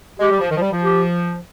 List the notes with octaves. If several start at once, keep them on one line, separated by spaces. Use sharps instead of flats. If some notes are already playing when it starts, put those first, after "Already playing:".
G#3 G4
G3
F3
D#3
F3
G3
F3
G4